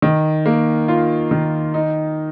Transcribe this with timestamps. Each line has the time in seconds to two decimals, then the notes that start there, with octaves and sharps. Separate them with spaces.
0.02 D#3
0.46 A#3
0.88 F4
1.31 D#3
1.74 D#4